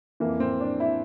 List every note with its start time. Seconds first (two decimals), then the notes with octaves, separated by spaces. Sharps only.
0.20 F2 E3 A#3
0.40 C4
0.60 D4
0.80 E4